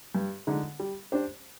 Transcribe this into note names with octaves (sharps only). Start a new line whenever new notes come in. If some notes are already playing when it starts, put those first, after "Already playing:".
G2
D3 G#3 D#4
G3
D4 G4 C5